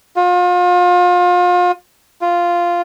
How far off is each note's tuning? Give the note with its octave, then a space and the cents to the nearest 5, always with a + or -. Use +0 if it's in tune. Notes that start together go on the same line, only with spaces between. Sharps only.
F4 +35
F4 -5